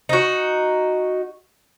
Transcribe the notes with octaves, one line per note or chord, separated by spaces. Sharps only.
D#4 F#4